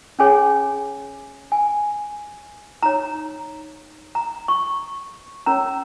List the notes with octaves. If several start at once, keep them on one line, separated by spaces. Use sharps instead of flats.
C#4 G#4 C#5 G#5
G#5
D#4 C#5 A#5
A#5
C#6
C#4 A#4 C#5 A#5